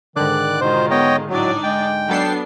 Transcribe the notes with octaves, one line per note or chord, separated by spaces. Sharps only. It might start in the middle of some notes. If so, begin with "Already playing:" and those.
G#2 D3 D#3 D5 D6 F#6
B2 D#3 G#3 F4 C5
B3 C#5 D#5 G5
A2 F#3 D4 D#4 D5
G#3 G5
F#3 B3 D4 A4 C7